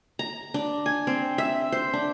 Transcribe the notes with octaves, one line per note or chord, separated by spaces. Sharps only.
A#5
D4
G#5
C4
E5
C5
D4